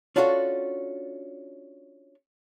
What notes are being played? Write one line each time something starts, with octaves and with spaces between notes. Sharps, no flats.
C#4 D4 F4 F#4 A4 C#5